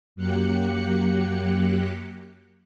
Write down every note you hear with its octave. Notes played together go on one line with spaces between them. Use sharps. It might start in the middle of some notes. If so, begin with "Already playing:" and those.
F#2 F#3 A#3 G4 F#6 C#7